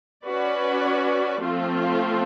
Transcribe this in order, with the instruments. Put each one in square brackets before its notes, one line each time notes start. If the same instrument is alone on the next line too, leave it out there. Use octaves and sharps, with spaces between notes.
[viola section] C#4 F#4 B4 D5
F3 A3 C4 F4